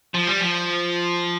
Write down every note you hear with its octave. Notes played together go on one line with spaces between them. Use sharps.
F3
G3
F3